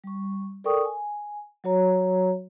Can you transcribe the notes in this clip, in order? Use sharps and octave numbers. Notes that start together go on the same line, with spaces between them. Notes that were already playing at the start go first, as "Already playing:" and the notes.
G3 C#6
A4 A#4 D5 G5 C#6 D#6
G#5
F#3 F#4 C#5 A#5